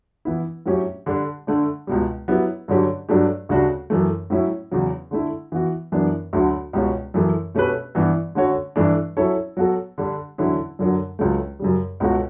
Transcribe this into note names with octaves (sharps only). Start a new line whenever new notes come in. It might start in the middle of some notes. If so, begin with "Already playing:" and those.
E3 B3 E4
A2 F#3 C#4 G4 C#5
D3 G3 D4
D3 A3 D4
C#2 B2 G3
F#3 B3 E4 G4 B4
G2 D3 F#3 C#4 G4
G2 F#3 A3 D4 G4
D2 C#3 G3 D4 F#4
F#2 E3 A3
A2 F#3 C#4 E4
E2 C#3 F#3
D3 A3 E4
E3 B3 F#4
F#2 E3 B3 D4
D2 D3 F#3
C#2 B2 G3 C#4 F#4
F#2 E3 A3
B2 A3 C#4 G4 B4
G2 E3 B3
D3 A3 C#4 F#4 C#5
G2 E3 A3 D4
F#3 C#4 E4 A4 C#5
F#3 B3 F#4 A4
D3 G3 D4
E2 D3 F#3 C#4 E4
F#2 D3 F#3
C#2 C#3 F#3 A3
F#2 C#3 G3
C#2 B2 A3 C#4 F#4